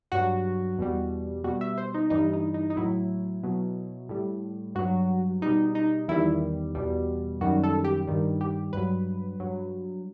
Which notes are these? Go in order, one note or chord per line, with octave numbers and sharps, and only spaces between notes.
G2 F#3 F#4
E2 B2 G3
B2 G3 F#4
E5
C5
D#4
G2 E3 G3 D#4
D#4
D#4
D#4
A2 F#3 E4
B2 F#3
A2 G3
G2 F#3 F#4
B2 G3 D#4
D#4
E2 D#3 G3 E4
E2 B2 G3
F#2 D#3 G3 F#4
A4
G4
G2 D#3 G3
G4
G2 F#3 B4
G2 F#3